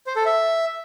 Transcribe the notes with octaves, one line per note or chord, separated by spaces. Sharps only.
C5
A4
E5